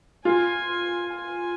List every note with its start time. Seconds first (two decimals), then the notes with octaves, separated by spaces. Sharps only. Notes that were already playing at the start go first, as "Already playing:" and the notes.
0.24 F4 G#5
1.13 G#5